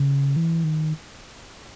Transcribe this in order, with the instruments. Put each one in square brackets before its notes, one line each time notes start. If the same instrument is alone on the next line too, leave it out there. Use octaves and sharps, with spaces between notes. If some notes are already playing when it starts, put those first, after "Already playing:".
Already playing: [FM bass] C#3
E3
D#3